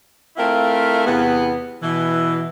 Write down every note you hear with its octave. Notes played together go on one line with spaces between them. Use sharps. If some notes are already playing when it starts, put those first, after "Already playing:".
A3 C4 E4 F4 A#4
E2 C3 B3
B2 E3